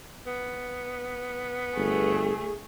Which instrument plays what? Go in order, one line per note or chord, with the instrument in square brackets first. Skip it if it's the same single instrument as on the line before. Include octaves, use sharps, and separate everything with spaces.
[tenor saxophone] B3
[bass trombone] G1 [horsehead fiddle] A3 G#4